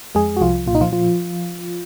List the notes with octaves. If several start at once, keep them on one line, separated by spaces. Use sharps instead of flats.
F2 G#3 G#4
F#4
C2 F3 F4
A#2 F4
D#4
F3 F4
F3 F4